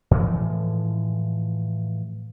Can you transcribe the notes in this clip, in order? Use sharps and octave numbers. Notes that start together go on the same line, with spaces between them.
A2 E3 F3 G#3